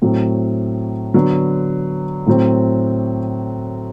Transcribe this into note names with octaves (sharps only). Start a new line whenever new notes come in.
A2 F#3 C4
D3 F#3 B3
A2 F#3 C4